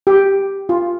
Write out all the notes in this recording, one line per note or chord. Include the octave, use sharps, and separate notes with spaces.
G4
F4